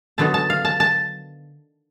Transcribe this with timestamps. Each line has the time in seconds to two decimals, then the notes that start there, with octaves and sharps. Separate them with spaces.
0.18 D3 F#3 B3 D#4 A5
0.34 A5
0.50 F5
0.65 A5
0.80 A5